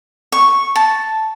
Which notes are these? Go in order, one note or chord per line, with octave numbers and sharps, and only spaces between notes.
C#6
A5